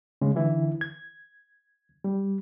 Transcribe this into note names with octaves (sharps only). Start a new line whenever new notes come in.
C#3 G#3
D3 E3 E4
G#6
G3